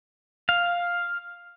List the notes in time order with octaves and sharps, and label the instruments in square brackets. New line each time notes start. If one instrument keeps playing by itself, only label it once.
[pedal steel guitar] F5